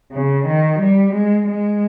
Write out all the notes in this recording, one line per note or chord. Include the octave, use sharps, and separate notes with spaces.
C#3
D#3
G3
G#3
G#3